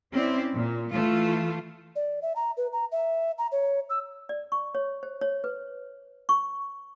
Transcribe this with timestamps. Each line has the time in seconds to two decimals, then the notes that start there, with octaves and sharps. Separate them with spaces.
0.14 C4 C#4 E4 D5
0.54 A#2
0.94 E3 A3 F4
1.96 D5
2.22 E5
2.36 A#5
2.57 B4
2.73 A#5
2.92 E5
3.38 A#5
3.52 C#5
3.90 E6
4.29 D5
4.52 C#6
4.75 C#5
5.03 C5
5.21 C#5
5.44 B4
6.29 C#6